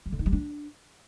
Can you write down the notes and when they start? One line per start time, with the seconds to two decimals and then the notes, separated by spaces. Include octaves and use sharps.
0.06 G3
0.12 D3
0.19 D#4
0.26 G3
0.33 D4